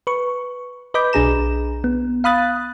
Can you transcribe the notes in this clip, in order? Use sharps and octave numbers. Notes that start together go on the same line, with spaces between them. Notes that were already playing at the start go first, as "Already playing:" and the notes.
B4 C#6
B4 D#5 B5 D6 G6
B1 D4 G#4 A#5 E7
B3
F5 B5 D#6 F#6 A6